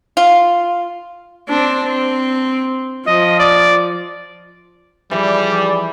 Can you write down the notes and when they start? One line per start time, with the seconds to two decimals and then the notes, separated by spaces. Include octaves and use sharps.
0.17 F4
1.49 C4 D4
1.85 C4
3.07 F3 D#5
3.40 D5
5.11 E3 F3 G3 G#4 D5